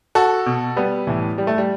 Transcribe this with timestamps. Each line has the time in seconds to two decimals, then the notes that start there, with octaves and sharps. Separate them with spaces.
0.15 F#4 A4
0.46 B2
0.76 G3 B3
1.07 A2 E3
1.38 G3
1.47 A3
1.58 G3